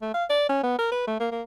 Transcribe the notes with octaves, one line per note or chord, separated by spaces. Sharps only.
A3
F5
D5
C#4
B3
A#4
B4
A3
A#3
A#3